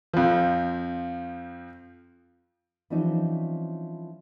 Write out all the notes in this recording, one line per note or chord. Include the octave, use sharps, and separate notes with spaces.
F2 F3
E3 F3 G3 C4 C#4 D#4